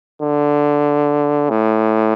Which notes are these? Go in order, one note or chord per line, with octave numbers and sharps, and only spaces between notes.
D3
A2